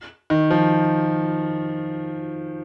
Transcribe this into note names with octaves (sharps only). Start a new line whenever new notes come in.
D#3
F3